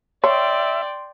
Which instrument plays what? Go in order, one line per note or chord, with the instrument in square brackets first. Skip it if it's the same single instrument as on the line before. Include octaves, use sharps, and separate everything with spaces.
[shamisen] C#5 [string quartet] D5 G5 [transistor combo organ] E5 [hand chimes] C6